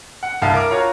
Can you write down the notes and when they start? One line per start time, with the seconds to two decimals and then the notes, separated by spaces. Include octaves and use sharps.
0.23 F#5
0.42 C2 F5 A5
0.54 A#4 D6
0.71 F4 F#4 C#5 A#5